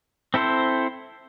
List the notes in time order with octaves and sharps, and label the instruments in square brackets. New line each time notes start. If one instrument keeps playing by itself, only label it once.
[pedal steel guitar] C4 E4 A4 C5